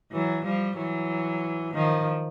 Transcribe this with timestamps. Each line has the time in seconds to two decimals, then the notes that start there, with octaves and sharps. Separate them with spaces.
0.12 E3 F#3
0.44 F3 G3
0.77 E3 F#3
1.74 D#3 F3